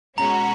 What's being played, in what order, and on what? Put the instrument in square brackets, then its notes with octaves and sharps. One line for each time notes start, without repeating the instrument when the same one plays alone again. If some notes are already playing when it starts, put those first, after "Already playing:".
[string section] B2 G#3 C#4 F#4 [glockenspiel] A#5